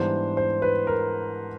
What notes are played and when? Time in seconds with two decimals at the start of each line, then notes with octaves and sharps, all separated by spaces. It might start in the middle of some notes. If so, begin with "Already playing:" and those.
Already playing: G#2 E3 G3 B3 D4 C5
0.37 C5
0.62 B4
0.87 A#4